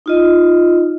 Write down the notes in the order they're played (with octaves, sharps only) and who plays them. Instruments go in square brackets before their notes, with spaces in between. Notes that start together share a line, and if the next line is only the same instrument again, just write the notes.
[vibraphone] D#4 F4 D#5